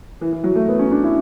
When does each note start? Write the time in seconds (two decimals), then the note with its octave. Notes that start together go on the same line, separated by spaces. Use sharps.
0.21 E3
0.32 E3
0.44 F#3
0.55 A3
0.68 B3
0.79 C#4
0.92 D4
1.04 E4